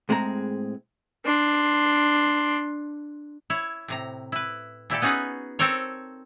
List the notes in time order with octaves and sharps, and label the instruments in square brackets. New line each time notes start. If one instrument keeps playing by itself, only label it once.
[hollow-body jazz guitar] A2 G#3 C4 G#4 A#5
[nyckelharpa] D4 C6
[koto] E4 C#5
A2 C3 A#5
E4 B4
A#2 E4 G4 A4
B3 C#4 D#4 F#4 G#4 B4
C4 A4 A#4 C#5